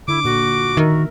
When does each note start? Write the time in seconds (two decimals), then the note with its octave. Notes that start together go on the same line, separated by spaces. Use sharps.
0.08 D3 E4 D6
0.24 A#2 F#4
0.77 D#3 A#4 E5